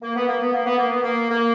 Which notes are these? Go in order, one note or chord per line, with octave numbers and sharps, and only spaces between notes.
A#3
B3
A#3
B3
A#3
B3
A#3
B3
A#3
A#3